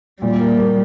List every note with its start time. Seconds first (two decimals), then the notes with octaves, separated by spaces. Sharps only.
0.21 A#2 G3
0.40 A#3
0.59 A#3